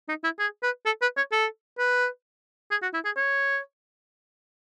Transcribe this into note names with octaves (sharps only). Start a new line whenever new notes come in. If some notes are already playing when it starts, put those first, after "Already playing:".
D#4
E4
G#4
B4
A4
B4
C#5
A4
B4
G#4
F#4
E4
G#4
C#5